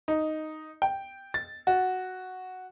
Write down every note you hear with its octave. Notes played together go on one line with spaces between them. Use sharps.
D#4
G5
A6
F#4